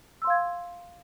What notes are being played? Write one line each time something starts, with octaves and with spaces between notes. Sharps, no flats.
F5 C6 E6 G#6